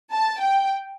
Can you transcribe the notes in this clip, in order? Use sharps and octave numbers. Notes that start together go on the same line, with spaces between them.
A5
G5